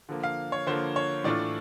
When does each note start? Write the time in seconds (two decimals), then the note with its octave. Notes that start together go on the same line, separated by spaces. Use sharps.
0.09 D3 F3 A#3
0.23 F5
0.52 C#5
0.67 D3 F3 A#3 C5
0.96 C#5
1.24 A2 E3 A3 D4 F4 D5